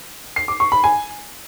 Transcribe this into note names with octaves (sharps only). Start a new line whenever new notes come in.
C7
D6
C#6
B5
G#5